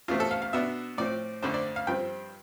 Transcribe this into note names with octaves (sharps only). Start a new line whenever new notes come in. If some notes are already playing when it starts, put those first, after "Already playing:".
E2 B2 A3 C4 F4
A4
F5
F5
B2 B3 D4 E5
A2 F3 C4 D5
F2 D3 A3 C4 C5
D5
F5
G2 F3 C4 G5